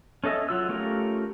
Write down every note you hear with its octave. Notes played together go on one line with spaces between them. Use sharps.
C#4 A4 D#5 E5
F#3 F4 E6
A3 C#4 F4 G4 A#4